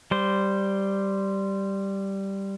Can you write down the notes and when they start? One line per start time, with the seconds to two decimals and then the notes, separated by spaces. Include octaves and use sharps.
0.11 G3 C5